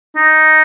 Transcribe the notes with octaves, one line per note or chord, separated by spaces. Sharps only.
D#4